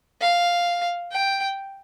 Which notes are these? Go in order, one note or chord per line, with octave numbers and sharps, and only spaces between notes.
F5
G5